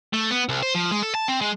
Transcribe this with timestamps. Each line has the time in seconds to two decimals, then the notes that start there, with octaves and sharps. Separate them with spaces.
0.13 A3
0.30 B3
0.49 C2
0.62 C5
0.75 F3
0.91 G#3
1.03 A4
1.15 A5
1.28 C4
1.41 G#3